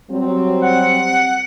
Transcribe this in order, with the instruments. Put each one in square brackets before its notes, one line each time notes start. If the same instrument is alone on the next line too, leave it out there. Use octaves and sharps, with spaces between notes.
[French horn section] F#3 G3 C4
[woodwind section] F#5